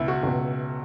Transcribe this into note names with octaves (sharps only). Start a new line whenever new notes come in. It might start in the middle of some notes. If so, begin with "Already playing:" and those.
Already playing: C#2 B2 E4
F#4
C#2 B2